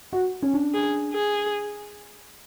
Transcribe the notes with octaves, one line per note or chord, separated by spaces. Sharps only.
F#4
C#4
D4
G#4
G#4